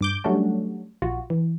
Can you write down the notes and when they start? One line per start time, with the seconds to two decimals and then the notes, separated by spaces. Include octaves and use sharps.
0.01 G2 D6 G6
0.24 F#3 G3 A3 C#4 D4 F#4
1.02 A#1 F4 F#4
1.30 E3